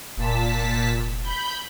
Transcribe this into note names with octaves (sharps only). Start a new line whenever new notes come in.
F1 A#2 A5 B6
B5 G6